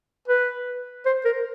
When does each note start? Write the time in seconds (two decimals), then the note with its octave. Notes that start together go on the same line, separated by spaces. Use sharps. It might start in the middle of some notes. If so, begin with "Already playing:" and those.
0.28 B4
1.05 C5
1.25 A#4